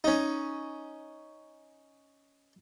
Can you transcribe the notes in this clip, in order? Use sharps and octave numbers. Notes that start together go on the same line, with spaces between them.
C#4 D#4